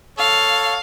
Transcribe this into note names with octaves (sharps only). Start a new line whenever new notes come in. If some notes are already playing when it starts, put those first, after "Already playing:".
A4 C#5 F5